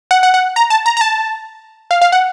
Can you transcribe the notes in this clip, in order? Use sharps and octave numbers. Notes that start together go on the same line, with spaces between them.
F#5
F#5
F#5
A#5
A5
A#5
A#5
A5
F5
F5
F#5